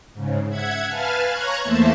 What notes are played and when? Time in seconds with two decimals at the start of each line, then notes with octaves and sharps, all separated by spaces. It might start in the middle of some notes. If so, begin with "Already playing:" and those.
0.14 G#2 C#3
0.49 E5 F#5 G#6
0.88 B4 F5 G#5 A5 F6
1.30 C#5 A#5 C#6 F#6 G#6
1.64 E2 A3 A#3 C5 E5 A5